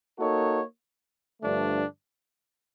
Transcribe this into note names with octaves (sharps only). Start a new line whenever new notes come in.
A#3 D#4 F#4 A4 C#5
G2 D3 F3 A3 D4